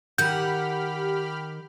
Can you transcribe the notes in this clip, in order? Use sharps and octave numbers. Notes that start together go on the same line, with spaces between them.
D#3 G4 F#5 B5 F6 G6